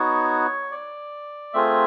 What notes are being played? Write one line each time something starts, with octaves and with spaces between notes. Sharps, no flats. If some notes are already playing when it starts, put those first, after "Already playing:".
Already playing: B3 D#4 F#4 C#5
D5
A3 C4 F4 G#4 E5